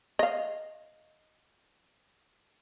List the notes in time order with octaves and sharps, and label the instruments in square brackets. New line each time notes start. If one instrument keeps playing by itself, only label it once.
[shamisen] D#5 F5